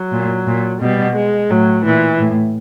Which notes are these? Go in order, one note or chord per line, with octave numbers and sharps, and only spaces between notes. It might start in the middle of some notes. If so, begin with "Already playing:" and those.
Already playing: F#3
A#2
A#2
B2 G3
G#3
A2 F#3
A#2 E3
A2